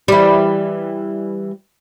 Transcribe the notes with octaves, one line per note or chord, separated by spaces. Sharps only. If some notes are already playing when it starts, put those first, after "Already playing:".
E3 G3